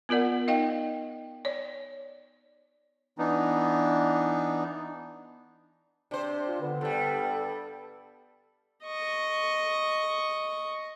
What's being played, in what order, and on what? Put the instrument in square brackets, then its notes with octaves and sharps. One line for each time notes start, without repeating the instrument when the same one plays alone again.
[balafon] B3 F4 A#4 D5 F#5
D#4 D#5 F5 G5
C#5 D5
[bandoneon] E3 B3 D4 D#4
[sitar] C3 C5 [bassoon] D4
[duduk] F4
[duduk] D3 [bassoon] B3
[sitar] G2 G3 [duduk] A4
[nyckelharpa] D#5 C#6